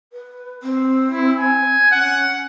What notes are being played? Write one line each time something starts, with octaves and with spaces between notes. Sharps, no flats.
B4
C4
E4
G#5
C#4 F#5